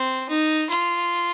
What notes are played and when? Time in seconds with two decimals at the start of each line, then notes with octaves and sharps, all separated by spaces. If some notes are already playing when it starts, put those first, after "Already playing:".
Already playing: C4
0.29 D#4
0.69 F4